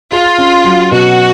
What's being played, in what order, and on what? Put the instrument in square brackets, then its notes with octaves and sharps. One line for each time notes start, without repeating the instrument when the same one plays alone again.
[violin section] F4 [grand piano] G#4
[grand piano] C#4
F#3
[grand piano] B2 [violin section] F#4